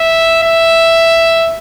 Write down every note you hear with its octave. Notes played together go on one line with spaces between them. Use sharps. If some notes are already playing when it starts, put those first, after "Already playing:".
Already playing: E5
E5